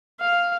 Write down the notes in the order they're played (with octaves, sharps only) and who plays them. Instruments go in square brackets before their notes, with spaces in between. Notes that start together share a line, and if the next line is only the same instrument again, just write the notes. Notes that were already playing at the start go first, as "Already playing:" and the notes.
[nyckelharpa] F5